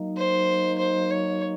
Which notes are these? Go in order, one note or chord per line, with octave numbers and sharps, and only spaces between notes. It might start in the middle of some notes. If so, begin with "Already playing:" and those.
Already playing: F#3 A#3 D#4
C5
C5
C#5